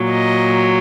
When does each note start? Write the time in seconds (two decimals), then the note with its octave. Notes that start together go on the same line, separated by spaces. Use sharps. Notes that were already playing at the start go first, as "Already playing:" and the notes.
Already playing: A#2 F#3
0.12 D#5